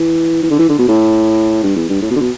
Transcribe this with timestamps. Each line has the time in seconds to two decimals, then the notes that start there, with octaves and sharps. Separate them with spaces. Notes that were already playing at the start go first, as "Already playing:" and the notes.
Already playing: E3
0.43 E3
0.51 D3
0.59 E3
0.69 D3
0.79 B2
0.88 A2
1.63 G2
1.76 E2
1.89 G2
2.02 A2
2.11 B2
2.16 D3
2.21 B2